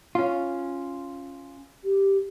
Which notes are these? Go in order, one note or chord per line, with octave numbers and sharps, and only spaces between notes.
C#4 F4
G4